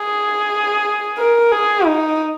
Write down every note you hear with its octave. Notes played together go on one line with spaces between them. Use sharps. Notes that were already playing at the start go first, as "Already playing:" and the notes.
Already playing: G#4
A#4
G#4
D#4